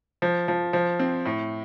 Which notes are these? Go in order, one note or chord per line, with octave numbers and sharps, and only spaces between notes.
F3
F3
F3
C4
A2